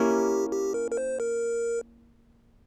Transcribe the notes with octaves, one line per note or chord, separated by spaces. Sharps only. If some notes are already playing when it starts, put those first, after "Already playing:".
Already playing: A#3 C#4 E4 G4
G4
A#4
A#4
C5
A#4